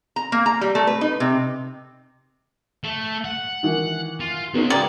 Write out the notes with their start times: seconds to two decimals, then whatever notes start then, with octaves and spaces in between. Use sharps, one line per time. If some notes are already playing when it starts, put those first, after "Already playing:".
0.16 A#5
0.32 A#3
0.46 A#5
0.61 G3
0.75 A3
0.87 B4
1.01 D#4
1.20 C3
2.84 A3
3.25 F#5
3.63 D#3 E3
4.20 F4
4.54 C#3 G#3 B3 C#4 D#4
4.70 D5 G5 A#5 D#6